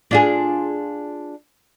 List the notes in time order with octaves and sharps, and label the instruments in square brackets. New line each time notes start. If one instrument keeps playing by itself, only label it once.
[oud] D4 F4 G#4